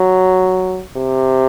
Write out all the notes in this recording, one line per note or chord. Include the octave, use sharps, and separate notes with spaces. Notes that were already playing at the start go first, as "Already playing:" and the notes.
Already playing: F#3
C3